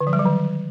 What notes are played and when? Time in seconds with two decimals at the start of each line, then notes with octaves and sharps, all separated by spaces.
0.01 D3
0.07 F3
0.13 G3
0.19 F#3
0.25 D#3